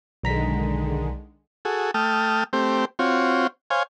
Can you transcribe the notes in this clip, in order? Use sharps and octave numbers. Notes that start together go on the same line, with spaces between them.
B1 D3 D#3 G#3 A#5 B6
F#4 G#4 A4
A3 G5 A5 D#6 F6
A3 C4 G4 C5
C4 F4 F#4 C#5
C5 C#5 F5 G#5